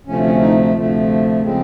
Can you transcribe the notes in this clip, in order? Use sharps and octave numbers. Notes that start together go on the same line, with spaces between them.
D2 C3 F3 A3 C#4
C#4
D#4
D2 C3 F3 A3
C#3 F3 G#3 C4